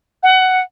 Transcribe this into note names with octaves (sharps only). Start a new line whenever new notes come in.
F#5